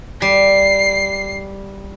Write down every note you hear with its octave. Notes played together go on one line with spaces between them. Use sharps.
G3 C7